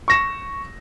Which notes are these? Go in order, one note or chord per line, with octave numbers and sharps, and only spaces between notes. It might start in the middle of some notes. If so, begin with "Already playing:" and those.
C#6 A#6 E7